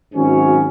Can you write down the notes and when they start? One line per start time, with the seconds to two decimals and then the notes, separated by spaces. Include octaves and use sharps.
0.14 G#1 G#2 F#3 C#4